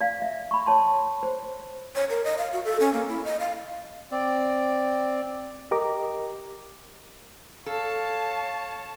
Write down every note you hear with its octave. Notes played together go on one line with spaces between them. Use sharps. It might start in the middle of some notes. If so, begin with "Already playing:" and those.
D5 F5
E5
B5 C#6
C#5 A5 C6
C5
C#5
A#4
D#5
F5
F#4
A4
C#4
A#3
E4
D#5
F5
C4 D5
G4 A#4 D#5 A#5 D6
A4 C#5 F5 A5